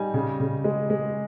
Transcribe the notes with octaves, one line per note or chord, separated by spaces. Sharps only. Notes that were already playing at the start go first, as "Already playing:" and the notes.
Already playing: G3 D#4 G#5
C#3
C#3
G#3
G#3